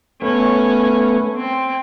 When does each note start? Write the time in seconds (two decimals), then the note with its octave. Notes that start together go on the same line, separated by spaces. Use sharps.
0.22 A3 B3 C#4
1.37 C4